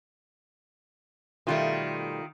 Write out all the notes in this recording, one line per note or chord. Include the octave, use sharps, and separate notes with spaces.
B2 D#3 G3 A3 F4